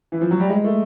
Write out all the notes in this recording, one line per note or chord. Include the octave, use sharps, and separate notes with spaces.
E3
F3
F#3
G3
G#3
A3